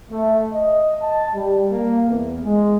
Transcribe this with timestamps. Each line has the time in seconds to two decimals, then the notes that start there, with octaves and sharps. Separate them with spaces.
0.11 A3
0.52 D#5
1.02 A5
1.34 G3
1.72 A#3
2.09 E2
2.43 G#3